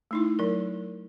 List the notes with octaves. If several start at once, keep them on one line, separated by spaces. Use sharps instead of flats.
A3 D#4 E4
F#3 A#4